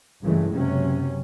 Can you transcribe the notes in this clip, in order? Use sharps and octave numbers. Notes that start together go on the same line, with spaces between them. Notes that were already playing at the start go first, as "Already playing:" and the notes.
G2 C#3 E3 G#3 A3
F#1 C3 F#3 C#4